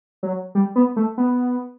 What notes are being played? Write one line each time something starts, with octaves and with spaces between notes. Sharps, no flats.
F#3
G3
B3
A3
B3